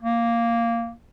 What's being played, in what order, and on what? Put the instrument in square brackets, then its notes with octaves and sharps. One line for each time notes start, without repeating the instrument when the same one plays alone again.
[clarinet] A#3